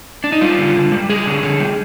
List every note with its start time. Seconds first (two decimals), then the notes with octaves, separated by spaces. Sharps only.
0.24 D4
0.32 D#4
0.41 G3 F4
0.58 D3
0.76 D3
0.92 G3
1.09 G3 G#4
1.27 D3
1.43 D3
1.60 G3